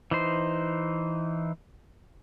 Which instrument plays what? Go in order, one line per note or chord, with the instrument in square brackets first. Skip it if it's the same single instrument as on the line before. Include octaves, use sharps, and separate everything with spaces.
[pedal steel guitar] E3 D#4 C5